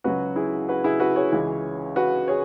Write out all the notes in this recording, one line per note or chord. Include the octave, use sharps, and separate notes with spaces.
C#2 C#3 F#3 F#4 B4
E4 G#4
F#4 B4
E4 G#4
F#4 B4
G#4 C#5
C#2 C#3 E3
F#4 B4
G#4 C#5